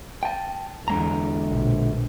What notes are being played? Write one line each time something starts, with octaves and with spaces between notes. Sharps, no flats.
G5 A5
E2 D3 G#3 A#5
A#1 B2